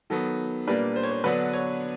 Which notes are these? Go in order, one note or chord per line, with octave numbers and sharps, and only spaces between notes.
D#3 F#3 B3 A4
A#2 G3 A#3 D4 B4
C5
C#5
C5
D3 F#3 B3 D4 B4
C#5